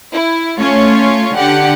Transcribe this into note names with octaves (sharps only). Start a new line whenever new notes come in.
E4
A3 C#4 F4 C#5
D3 G4 F#5